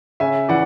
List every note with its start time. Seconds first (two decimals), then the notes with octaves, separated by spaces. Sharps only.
0.20 C#3 E5 G#5
0.49 E3 D5 F#5